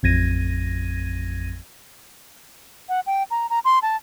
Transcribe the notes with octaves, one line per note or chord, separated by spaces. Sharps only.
A1 F2 G#6 A#6 D#7
F#5
G5
A#5
A#5
C6
A5